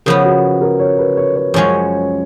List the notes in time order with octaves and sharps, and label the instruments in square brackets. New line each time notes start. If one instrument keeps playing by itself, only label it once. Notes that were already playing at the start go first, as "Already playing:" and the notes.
[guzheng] C#3 F3 B3 [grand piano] A#4
[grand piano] F#4
A#4
C#5
B4
C#5
C#5
[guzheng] F#2 F3 G#3 C#4 [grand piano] C#5